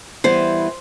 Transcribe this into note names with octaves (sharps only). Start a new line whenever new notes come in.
E3 G3 B3 C5